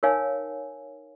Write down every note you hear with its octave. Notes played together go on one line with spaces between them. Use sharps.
D#4 A#4 C#5 F5 G#5